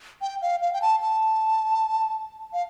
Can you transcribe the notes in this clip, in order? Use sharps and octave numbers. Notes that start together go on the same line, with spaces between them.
G5
F5
F5
G5
A5
A5
F5